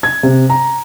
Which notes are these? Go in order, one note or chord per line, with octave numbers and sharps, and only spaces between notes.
G#6
C3
A#5